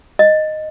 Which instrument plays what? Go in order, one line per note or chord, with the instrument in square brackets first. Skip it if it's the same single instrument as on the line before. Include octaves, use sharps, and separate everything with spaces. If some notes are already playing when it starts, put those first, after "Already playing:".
[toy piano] D#5